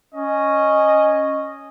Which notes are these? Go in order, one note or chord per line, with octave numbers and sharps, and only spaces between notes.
C#4 D#5